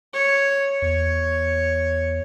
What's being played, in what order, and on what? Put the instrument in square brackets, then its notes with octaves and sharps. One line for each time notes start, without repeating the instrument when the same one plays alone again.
[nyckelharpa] C#5
[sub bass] E2 [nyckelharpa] C#5